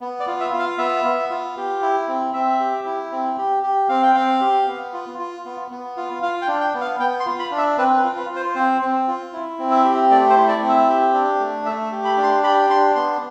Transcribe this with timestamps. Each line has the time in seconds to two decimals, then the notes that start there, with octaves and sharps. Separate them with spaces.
0.01 B3
0.20 D5
0.27 F4
0.40 E5
0.53 F4
0.59 F5
0.78 B3 E5
1.05 B3
1.30 F4
1.57 G4
1.82 E4
2.08 C4
2.33 C4 E5
2.60 G4
2.86 E4
3.12 C4
3.38 G4
3.63 G4
3.89 C4 F5
4.03 G5
4.15 C4 F5
4.41 G4
4.67 B3
4.93 F4
5.19 F4
5.45 B3
5.71 B3
5.97 F4
6.22 F4 F5
6.42 G5
6.48 D4
6.60 G5
6.74 B3
6.81 F5
7.00 B3 G5
7.20 C6
7.26 F4
7.39 B5
7.51 D4
7.58 E5
7.78 C4 B4
7.98 B4
8.04 F4
8.17 B4
8.30 F4
8.36 C5
8.55 C4 C5
8.81 C4
9.07 F4
9.33 E4
9.59 C4
9.71 E5
9.84 G4
10.11 A3 D5
10.30 C5
10.37 E4
10.49 D5
10.62 C4
10.69 E5
10.89 G4
11.13 D4
11.40 A3
11.66 A3 E5
11.92 G4
12.05 B5
12.17 D4
12.23 C6
12.43 G4 B5
12.70 D4 C6
12.95 B3 C6